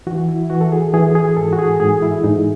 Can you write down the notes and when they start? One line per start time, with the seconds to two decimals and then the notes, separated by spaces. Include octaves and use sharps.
0.07 E3 F#4
0.28 E4
0.50 E3 F#4
0.61 A4
0.72 G#4
0.93 E3 G#4
1.15 G#4
1.37 G#2 A4
1.53 F#4
1.59 G#4
1.80 G#2 G#4
2.02 E4
2.23 G#2 D#4